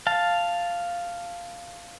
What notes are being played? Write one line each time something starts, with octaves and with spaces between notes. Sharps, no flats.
F5 A5